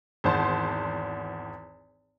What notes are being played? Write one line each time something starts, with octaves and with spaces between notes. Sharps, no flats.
G#1 E2 C5 A5 C6